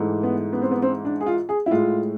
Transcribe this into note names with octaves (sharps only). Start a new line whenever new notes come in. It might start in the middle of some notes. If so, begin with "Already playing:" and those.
Already playing: G#2 E3 A3
B3
B3
C4
B3
C4
D4
G#4
F4
G#4
E4
A2 G#3 F4